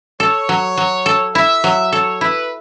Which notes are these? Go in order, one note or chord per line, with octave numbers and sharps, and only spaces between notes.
A4 C#5
F#3
F#3
A4
E4 E5
F#3
A4 C#5
E4 B4